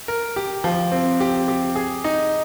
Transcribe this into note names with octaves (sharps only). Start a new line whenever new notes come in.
A#4
G4
F3
C4
G4
G4
G#4
D#4